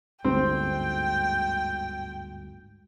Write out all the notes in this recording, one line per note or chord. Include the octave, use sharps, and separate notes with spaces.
G1 D2 G#2 C4 G5